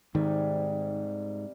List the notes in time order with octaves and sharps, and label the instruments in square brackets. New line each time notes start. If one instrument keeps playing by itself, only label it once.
[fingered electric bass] G#2 [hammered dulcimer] C3 G3 [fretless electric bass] D#3